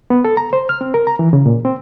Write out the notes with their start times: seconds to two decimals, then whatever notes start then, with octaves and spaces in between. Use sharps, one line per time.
0.10 B3
0.25 A4
0.37 A#5
0.53 C5
0.69 F6
0.81 C4
0.94 A#4
1.07 A#5
1.19 E3
1.33 C#3
1.46 A#2
1.65 C4